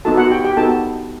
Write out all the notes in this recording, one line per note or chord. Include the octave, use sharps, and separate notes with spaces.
B3 D#4 F#4 A4 A5
F#4 F#5
G4 G5
G4 G5
B3 D#4 F#4 A4 A5